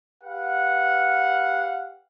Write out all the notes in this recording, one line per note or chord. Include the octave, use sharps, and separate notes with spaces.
G4 B4 F5 F#5